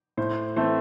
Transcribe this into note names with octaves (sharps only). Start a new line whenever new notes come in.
A2 C5
E3 A3 C4 C5